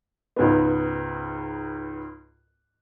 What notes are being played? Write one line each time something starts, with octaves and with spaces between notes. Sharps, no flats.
C#2 G#2 B3